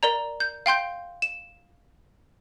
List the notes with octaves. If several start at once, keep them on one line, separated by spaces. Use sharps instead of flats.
A#4 D5 A#5
G6
F5 G5 C6 G6
E7